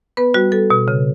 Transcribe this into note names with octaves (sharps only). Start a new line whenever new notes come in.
B3 B4
G3 F#4
G3 A4
B2
C#3